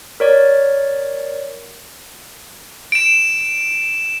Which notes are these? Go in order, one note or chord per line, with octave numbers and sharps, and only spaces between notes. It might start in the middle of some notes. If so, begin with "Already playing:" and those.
A#4 C#5 D5
D7 E7